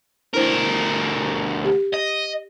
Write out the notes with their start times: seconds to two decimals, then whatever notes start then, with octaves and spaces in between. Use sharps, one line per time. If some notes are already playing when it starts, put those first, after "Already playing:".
0.34 D2 D4 E4 A#4 C5
1.65 G4
1.93 D#5